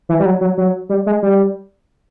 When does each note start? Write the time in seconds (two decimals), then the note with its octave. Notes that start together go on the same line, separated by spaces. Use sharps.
0.09 E3
0.20 G3
0.25 F#3
0.41 F#3
0.57 F#3
0.89 G3
1.06 G#3
1.23 G3